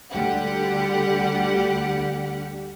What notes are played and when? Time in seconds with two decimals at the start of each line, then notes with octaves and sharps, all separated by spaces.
0.11 D2 D3 G3 G4 F#5